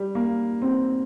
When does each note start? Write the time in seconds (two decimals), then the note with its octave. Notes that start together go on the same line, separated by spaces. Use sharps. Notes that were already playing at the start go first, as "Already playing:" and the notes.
Already playing: G3
0.15 A#3
0.62 C4